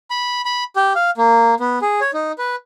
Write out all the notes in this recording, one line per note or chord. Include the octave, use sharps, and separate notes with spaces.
B5
B5
G4
F5
A#3
B3
G#4
C#5
D#4
B4